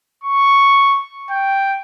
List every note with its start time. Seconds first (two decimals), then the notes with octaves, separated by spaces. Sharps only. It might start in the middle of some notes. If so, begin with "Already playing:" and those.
0.24 C#6
1.31 G5